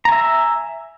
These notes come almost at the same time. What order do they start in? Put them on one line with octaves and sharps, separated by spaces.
A#5 G#5 E5